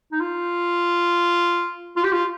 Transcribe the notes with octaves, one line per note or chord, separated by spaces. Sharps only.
D#4
F4
F4
G4
F4